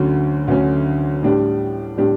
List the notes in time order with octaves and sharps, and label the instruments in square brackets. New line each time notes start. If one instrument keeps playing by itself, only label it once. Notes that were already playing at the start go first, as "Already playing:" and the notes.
Already playing: [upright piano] D2 D3 F#3 C#4
D2 D3 F#3 C#4
A2 G3 D4 G4
A2 G3 D4 G4